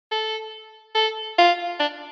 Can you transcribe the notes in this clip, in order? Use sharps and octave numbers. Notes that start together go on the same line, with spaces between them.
A4
A4
F4
D4